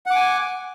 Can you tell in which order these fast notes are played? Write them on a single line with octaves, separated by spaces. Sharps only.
F#5 D6 G#5